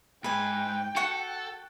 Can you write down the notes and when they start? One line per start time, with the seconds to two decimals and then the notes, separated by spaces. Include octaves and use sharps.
0.24 G#2 B4 G5 G#5
0.96 F#4 A4 F#5 C#6